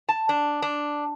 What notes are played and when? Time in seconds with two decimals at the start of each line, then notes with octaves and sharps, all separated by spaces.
0.09 A5
0.29 D4
0.62 D4